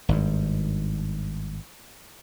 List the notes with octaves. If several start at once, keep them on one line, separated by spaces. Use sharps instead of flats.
G#1 G2